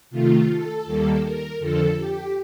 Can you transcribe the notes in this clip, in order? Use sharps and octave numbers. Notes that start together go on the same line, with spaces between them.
C3 D#3 A3 F4
A4
D#2 D#3 G3 A#3
A#4
F2 D3 F3 A4
G4